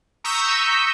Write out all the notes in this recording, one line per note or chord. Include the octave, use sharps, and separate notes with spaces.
A#5 C#6 D#6 E6 G6 B6